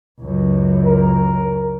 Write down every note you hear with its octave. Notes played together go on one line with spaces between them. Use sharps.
C#2 F#2
A#4